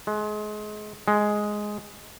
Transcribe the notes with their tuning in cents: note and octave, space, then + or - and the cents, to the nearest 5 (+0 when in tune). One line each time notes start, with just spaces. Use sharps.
G#3 +30
G#3 +5